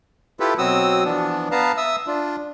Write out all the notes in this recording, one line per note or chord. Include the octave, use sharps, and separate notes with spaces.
E4 F4 G4 A4 B4
B2 F#3 C4 F#4 D#6 E6
E3 F3 B3 D4
B3 B4 F5 A5 A#5
E5 D#6 E6
D4 F4